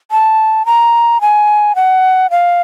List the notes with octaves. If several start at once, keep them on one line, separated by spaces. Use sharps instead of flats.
A5
A#5
G#5
F#5
F5